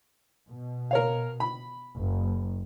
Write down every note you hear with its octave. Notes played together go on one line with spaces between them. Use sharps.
B2
A#4 C#5 F5
B5
F#1